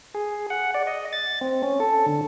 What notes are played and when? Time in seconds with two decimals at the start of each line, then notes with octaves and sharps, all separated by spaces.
0.15 G#4
0.50 F#5
0.74 D5
0.87 D#5
1.13 A6
1.41 C4
1.63 C#4
1.80 A4
2.07 D3